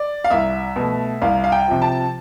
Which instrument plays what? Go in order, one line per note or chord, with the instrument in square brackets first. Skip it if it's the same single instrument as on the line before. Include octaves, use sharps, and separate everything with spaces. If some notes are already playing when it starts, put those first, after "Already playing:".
Already playing: [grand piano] D5
F5
C2 E5
B2 A3
C2 F5
F5
G5
C3 F3
A5